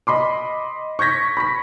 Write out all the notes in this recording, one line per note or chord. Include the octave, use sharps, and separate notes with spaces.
D#5 B5 C6 D6
C#6 G6 G#6 A#6 B6
B5 C#6 B6